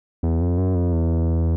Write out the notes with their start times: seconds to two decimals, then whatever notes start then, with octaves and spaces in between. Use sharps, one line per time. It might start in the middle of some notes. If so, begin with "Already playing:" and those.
0.23 E2
0.41 F2
0.58 F#2
0.75 F2
0.92 E2